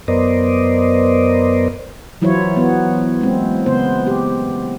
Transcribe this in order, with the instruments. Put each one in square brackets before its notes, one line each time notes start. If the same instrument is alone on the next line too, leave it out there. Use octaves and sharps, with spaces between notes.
[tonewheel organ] F#2 B3 A#4 C5 D5 D#5
[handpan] E3 F#3 E4 F4 C5 C#5
B3
G#3 A#3 C4
C#3 B3 C5
G4